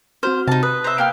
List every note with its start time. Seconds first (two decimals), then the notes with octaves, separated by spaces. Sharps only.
0.23 C4 F#4 C5 F6
0.47 C3 D#4 A5
0.63 B4 D#6
0.84 C5 E5 A#5
0.98 A#3 G5 F6